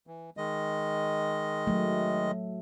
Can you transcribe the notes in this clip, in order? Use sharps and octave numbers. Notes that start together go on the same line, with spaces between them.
E3
D#3 G#3 D#5
F#3 A3